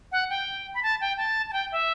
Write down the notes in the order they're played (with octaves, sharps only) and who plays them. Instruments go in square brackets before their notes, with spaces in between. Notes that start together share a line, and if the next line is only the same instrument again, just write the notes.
[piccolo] F#5
G5
B5
A5
G5
A5
A5
G5
E5